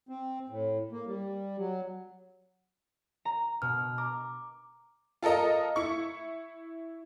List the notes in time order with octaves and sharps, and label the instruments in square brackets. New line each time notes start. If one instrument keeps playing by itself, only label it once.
[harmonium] C4
A2
A#3
G3
F#3
[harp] A#5
[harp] B2 [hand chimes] F6
[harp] A#5 [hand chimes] D6
[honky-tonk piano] F4 A4 A#4 D#5 A#5
E4 C#6